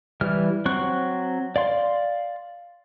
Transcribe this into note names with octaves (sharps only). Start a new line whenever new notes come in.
E3 G3 F6
F#3 C4 C#6 F#6
D5 F5 C6